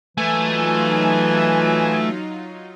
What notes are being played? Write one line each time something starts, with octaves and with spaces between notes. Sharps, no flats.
E3 F#3 A3 D#4 F4 G#5